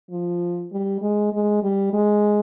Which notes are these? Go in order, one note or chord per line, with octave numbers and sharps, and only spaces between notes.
F3
G3
G#3
G#3
G3
G#3